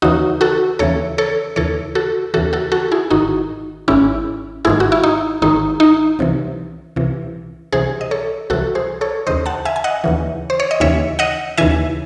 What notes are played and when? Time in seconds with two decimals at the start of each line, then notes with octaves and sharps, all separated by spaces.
0.02 D#2 C#3 E3 D#4 F#4
0.41 F#4 A4
0.79 D#2 C#3 E3 A4 C#5
1.18 A4 C#5
1.56 D#2 C#3 E3 A4 C#5
1.95 F#4 A4
2.34 D#2 C#3 E3 F#4 A4
2.53 F#4 A4
2.72 F#4 A4
2.92 E4 G#4
3.10 G#1 G#2 D#3 D#4 F#4
3.88 G#1 G#2 D#3 C#4 E4
4.65 G#1 G#2 D#3 E4 G#4
4.80 F#4
4.92 E4
5.03 D#4
5.42 G#1 G#2 D#3 D#4
5.80 D#4
6.19 C2 C3 E3
6.96 C2 C3 E3
7.72 C2 C3 E3 G#4 C5
8.01 D#5
8.11 A4 C#5
8.50 C2 C3 E3 F#4 A4
8.75 G#4 C5
9.01 A4 C#5
9.27 D#2 C#3 E3 C5 D#5
9.46 F#5 A5
9.65 E5 G#5
9.76 G#5
9.84 D#5 F#5
10.04 D#2 C#3 E3
10.50 C5
10.60 C#5
10.71 D#5
10.80 D#2 C#3 E3 C#5 E5
11.19 D#5 F#5
11.57 D#2 C#3 E3 E5 G#5